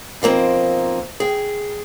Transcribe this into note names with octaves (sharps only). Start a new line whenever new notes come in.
B2 F3 A#3 C4 D#4
G#4 G5